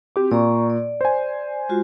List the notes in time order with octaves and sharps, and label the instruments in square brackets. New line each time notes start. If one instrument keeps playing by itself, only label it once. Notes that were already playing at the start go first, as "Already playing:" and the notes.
[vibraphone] C4 F#4 [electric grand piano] G4 D6
[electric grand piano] A#2 [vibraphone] D5 A#5 C#6
[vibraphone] D5
[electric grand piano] C5 G#5
[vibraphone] G#3 F4 F#4